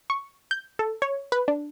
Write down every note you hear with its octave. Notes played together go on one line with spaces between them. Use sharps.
C#6
G6
A4
C#5
B4
D4